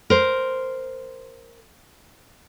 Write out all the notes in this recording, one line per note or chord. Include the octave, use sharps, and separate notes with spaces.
A#4 C5